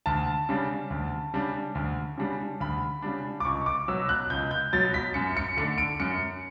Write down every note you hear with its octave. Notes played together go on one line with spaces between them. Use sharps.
D2 A5
C#3 G3 D4
D2
C#3 G3 D4
D2
C#3 G3 D4
D2 B5
C#3 G3 D4
D6
C#2 C#6
D6
B2 F#3 E6
F#6
C#2 G6
G6
B2 F#3 A6
B6
F#2 C#7
C#7
D3 A3 D4 C#7
D7
F#2 C#7